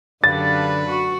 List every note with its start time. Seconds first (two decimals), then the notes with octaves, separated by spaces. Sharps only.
0.24 F#2 D3 D4 G4 B4 D5 F5 A6
0.88 F#4 C#6